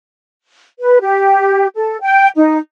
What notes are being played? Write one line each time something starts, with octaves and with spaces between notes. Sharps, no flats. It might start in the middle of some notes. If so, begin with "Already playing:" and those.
B4
G4
A4
G5
D#4